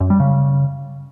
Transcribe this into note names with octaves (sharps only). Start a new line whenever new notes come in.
F#2
G3
C#3